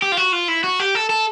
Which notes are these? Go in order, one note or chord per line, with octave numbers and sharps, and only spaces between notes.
G4
F4
F#4
F4
E4
F#4
G4
A4
A4